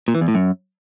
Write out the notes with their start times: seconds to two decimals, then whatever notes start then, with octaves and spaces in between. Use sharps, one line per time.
0.08 A#2
0.15 E3
0.21 E2
0.28 A2
0.35 F#2